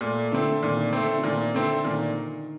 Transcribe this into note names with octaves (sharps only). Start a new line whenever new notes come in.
A#2 A3
D3 A3 C4
A#2 D#3
A3 C4
D3
A#2 D#3
D3 A3 C4
A#2 D#3